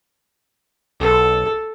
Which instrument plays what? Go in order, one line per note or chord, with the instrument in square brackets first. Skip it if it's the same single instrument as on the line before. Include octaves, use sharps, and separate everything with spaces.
[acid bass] B1 [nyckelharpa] A4